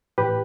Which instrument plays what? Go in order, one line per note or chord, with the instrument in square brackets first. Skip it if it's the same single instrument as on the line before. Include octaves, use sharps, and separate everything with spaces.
[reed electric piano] A2 E3 G4 B4